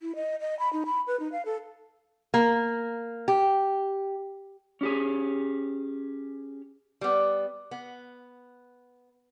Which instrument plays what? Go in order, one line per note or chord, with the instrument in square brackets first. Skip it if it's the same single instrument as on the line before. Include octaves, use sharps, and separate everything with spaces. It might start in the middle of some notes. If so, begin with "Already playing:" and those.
[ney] E4
D#5
D#5
B5
D#4
B5
B4
D#4
F5
A4
[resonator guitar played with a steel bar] A#3
G4
[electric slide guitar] C#4 G4 G#4
[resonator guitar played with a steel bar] G3 B3
B3